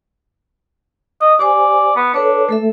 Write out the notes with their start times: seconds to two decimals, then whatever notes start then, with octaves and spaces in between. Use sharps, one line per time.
1.21 D#5 D#6
1.39 G4 C5 D5 G#5
1.96 B3
2.14 D4 A4 B4 C#5
2.49 A3 A4 E5